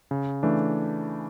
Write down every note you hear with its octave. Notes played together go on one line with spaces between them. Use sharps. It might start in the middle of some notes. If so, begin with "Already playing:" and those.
C#3
E3 A3 D4